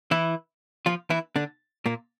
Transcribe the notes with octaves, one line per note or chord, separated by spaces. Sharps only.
E3 E4
F3 F4
E3 E4
D3 D4
A#2 A#3